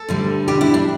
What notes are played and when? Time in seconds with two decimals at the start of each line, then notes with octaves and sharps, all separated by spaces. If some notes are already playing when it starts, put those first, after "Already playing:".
Already playing: A4
0.09 D2 D3 G3
0.48 B2 G3 D4 G4
0.61 E4
0.74 D4